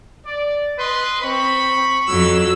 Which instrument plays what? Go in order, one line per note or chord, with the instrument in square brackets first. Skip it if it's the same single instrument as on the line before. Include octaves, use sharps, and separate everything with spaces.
[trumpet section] D5
B4 D#5 C6
[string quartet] C4 [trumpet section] B5 C#6
[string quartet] F2 F#3 E6